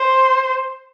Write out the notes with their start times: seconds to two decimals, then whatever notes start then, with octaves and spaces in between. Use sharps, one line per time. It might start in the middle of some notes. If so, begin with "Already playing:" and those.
Already playing: C5